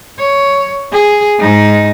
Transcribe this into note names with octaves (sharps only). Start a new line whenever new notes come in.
C#5
G#4
G#2 D#4